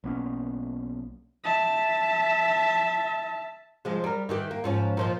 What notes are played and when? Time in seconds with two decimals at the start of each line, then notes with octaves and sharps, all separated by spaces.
0.04 B1 A#3 B3 C#4
1.44 E5 A5
3.85 C3 F3 G#3
4.04 G3 A#4
4.29 D#3 E3 G4
4.51 A#3
4.64 G#2 F3 C#4
4.97 A#2 F3 D#4